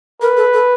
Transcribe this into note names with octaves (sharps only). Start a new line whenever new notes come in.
A#4 B4
A4
A4